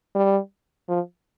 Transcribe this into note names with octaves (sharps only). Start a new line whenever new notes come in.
G3
F3